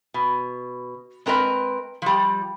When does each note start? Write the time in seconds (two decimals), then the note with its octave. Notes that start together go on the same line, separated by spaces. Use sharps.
0.14 B2
1.26 G#3 C4 A#4 B4 D#5
2.02 F3 G3